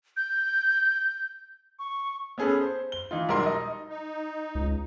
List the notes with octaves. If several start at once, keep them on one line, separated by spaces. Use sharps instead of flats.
G6
C#6
B3 C#4 G#4 A4 B4
C5
G7
E3 D#4 F4
E1 B1 G3 A#4 A#5 C6
D#4 D#5
D#4
C#2